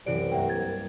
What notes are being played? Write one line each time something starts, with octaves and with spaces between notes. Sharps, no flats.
C2 F#2 C3 E3 D5 D7
G2 A#3 E5 F#5 G5
G#6 A6